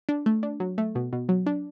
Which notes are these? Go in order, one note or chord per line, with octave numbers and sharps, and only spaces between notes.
D4
A3
D4
F#3
A3
B2
B2
F#3
D4